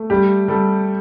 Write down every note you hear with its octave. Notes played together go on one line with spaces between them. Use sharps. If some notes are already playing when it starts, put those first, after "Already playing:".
Already playing: A3
G3 G4
G3 A4